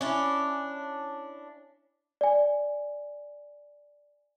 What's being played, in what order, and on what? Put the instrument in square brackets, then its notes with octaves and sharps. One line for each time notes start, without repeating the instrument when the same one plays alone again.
[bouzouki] C#4 D4 E4
[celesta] D5 G#5